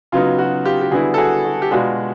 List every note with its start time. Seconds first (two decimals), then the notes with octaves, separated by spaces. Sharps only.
0.12 C#3 F#3 B3 D#4 F4
0.39 F#4
0.65 F4 G4
0.81 G4
0.91 D3 G3 B3 E4 F#4 G#4
1.14 A4
1.18 F#4 G#4
1.45 F#4
1.62 G4
1.71 B2 G#3 B3 D4 F4 F#4